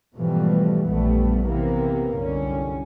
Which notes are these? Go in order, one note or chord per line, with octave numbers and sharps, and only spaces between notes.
G#2 B2 E3 F3 G3 A3
A#1 F#2 G3 A3 B3
C3 E3 A#3 B3
C2 F#2 D3 C#4